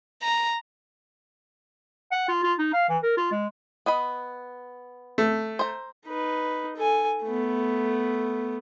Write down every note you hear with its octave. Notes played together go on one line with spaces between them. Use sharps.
A#5
F#5
F4
F4
D#4
F5
E3
A#4
F4
G#3
B3 D#5 B5
A3
C5 A#5
D#4 B4
A4 G#5
A3 B3